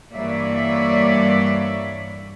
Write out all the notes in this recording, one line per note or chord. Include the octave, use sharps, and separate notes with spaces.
G2 E3 A#3 C#5 D5 E5